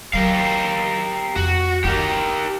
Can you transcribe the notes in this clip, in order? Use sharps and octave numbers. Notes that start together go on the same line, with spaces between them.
F#3 G4 A#4 F5
F2 F#4
D#4 G4 A#4